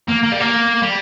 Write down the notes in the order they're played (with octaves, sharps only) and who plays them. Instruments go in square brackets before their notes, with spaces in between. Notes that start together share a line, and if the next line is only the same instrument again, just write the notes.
[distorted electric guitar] A#3
A#3
G3
A#3
G3